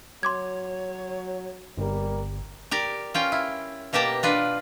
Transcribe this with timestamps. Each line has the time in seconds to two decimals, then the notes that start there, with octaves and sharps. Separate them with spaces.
0.23 F#3 C#5 C6 D6 G#6
1.78 G1 G3 A#3
2.71 G4 A#4 D5
3.14 C#4 F4 G5
3.32 E4
3.93 B2 A#3 G4 G5 A5 A#5
4.23 D4 F4 B4